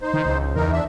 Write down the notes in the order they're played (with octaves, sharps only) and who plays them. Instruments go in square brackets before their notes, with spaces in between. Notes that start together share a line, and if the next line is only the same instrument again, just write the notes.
[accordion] D#4 C5
[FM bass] D#3
C#2
[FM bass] E2 [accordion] D#4 A#4
[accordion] D4 E5